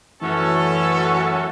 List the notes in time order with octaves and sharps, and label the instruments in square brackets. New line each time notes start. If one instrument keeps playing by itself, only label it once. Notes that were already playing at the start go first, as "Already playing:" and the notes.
[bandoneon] F#2 A3 [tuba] E3 [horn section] C#4 F#4 A4